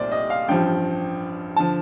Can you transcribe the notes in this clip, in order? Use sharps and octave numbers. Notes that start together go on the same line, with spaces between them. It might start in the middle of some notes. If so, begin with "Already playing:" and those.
Already playing: C2 A#2 A3 C5 D5
D#5
F5
A1 G2 F3 G5
D3 F3 A5